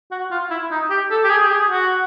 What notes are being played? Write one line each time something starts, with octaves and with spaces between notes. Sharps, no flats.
F#4
F4
E4
D#4
G4
A4
G4
G#4
G4
G#4
F#4